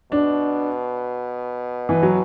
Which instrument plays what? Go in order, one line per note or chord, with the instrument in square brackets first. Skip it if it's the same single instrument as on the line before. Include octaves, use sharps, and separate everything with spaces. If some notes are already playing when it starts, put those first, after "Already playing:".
[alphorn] B2 [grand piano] D4
[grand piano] E3
F#3